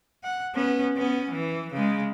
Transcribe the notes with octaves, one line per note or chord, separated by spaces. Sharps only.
F#5
B3 C#4
B3 C#4
E3
C#3 G#3